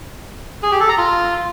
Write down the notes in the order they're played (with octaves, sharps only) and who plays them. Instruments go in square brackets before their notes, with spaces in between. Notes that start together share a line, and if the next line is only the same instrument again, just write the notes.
[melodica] G#4
G4
A4
A#5
F4